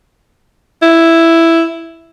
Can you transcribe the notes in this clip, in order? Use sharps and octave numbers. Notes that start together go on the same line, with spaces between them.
E4